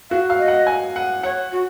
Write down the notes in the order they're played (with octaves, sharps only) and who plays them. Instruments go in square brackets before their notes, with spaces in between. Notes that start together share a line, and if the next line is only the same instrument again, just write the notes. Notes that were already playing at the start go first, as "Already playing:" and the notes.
[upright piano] F#4 [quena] F5
[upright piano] F5
[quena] D#5
[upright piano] F#5
G#5
F#5
[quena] C#5 [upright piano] F#5
[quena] F#4